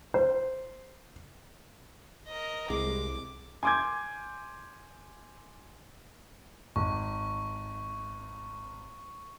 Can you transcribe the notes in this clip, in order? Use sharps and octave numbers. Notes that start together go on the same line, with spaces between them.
C5
A#4 D#5
C2 G#3 D6
G#5 C6 D6 G6 G#6
G#1 C#6